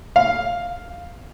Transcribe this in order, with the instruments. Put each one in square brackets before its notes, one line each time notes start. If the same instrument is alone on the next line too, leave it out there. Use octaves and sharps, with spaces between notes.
[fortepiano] F5